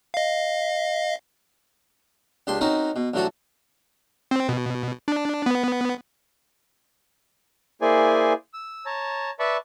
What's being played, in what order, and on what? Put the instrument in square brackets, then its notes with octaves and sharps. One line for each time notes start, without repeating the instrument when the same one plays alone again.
[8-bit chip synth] D#5 F5
[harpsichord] C#2 D4 G4 C6
C4 C#4 D#4 F#4 A#4
B2
A1 D3 F#3 F#4 A4
[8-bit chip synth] C4
B2
D4
B3
[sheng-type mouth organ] A#3 E4 G#4 C5 D5 G#5
E6
C#5 A5 A#5
B4 D5 E5 A5 B5 C#6